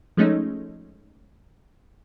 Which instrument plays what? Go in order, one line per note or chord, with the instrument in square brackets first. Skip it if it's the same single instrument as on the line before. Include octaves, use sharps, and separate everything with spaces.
[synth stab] F3 G#3 A3 C#4 D#4